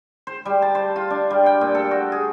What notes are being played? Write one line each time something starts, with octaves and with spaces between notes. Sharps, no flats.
C5
G3
A5
C5
F4
D4
G3
G5
A#2
A4
F#4
G#4